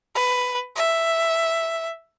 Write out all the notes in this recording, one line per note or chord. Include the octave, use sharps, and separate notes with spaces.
B4
E5